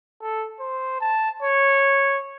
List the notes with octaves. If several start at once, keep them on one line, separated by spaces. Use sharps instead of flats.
A4
C5
A5
C#5